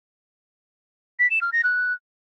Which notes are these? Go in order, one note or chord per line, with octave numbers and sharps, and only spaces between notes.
B6
E7
F6
A#6
F#6